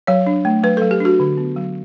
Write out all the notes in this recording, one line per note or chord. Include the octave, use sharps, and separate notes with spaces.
F#3 C#5
D4
A3
F#3 B4
F#3 A4
G4
D4 F#4
D3
B3
F#3